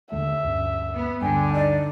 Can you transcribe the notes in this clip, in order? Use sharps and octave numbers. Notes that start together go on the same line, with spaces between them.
D#2 D3 A3 E5
D2 G2 C#4
B3
D2 G2 D3 G5 G#5
D#4 D5